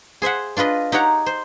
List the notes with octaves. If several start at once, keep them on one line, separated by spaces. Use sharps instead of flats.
G#4 C5 E5 F#5
D4 F4 B4 D#5
D#4 G4 C#5 F#5 A#5
C5